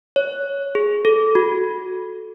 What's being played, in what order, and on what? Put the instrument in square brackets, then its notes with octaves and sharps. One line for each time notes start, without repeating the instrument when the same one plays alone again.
[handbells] C#5
G#4
A4
F#4